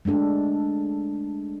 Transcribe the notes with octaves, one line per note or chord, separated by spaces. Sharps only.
G#3 A3 D4 A4